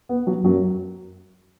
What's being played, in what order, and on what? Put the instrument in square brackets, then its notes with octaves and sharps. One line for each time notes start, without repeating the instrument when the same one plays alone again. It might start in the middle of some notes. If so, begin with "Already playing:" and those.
[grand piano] B3
F#3
[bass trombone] F#2 [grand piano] F#3